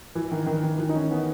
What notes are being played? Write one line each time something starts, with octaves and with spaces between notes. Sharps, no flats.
E3
D#3
D#3
D#3
E3
D#4
C#4
B3